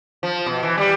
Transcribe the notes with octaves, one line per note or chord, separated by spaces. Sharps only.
F3
B2
E3
G3